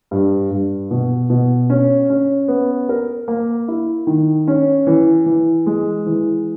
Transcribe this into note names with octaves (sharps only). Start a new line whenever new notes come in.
G2
G2
B2
B2
C#4
C#4
B3
A#4
A#3
E4
D#3
C#4
E3
E3
G#3
E3